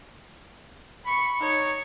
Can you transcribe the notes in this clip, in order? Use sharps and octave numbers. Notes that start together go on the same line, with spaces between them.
B5 C#6
D#4 C#5